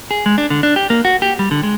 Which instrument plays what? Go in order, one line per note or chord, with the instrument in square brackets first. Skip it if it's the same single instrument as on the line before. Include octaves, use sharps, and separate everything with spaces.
[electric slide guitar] G#4
G#3
D4
D3
D4
G4
A#3
F#4
G4
G3
D3
G#3